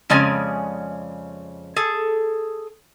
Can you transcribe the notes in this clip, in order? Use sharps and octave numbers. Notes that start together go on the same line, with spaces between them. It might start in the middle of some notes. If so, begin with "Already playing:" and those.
F2 C#3 G#3 C#5 D5 G#5
G#4 A4